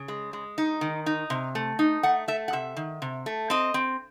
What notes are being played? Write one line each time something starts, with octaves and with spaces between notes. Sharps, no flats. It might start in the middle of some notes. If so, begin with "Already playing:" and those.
Already playing: C#3
G#3
G#3
D#4
D#3
D#4
C3
A3
D#4
A3 F#5
A3 E5
F#5
C3 E5
D#3
C3
A3
C4 D#5
C4